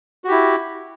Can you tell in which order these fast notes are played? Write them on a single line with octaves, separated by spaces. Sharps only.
F#4 G4 E4